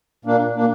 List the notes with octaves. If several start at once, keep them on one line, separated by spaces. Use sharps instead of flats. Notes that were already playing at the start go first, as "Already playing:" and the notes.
A#2 A#3 D4
A#2 A#3 D4